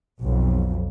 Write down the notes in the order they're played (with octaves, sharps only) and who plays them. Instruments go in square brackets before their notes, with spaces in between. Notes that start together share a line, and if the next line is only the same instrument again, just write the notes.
[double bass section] B1 F2